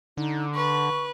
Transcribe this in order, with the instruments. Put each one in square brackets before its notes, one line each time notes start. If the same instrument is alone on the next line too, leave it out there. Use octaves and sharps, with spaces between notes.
[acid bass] D3 [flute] D#4
[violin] B4 [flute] C#6